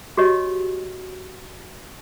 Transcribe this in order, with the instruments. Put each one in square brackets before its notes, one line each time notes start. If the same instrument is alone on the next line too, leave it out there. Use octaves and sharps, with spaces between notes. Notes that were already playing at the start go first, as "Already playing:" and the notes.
[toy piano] F#4 G4 C#5 D#5